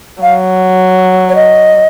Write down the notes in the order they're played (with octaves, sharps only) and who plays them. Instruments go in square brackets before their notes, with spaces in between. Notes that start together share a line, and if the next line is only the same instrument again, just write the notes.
[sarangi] F#3 [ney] F5
[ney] C#5
D#5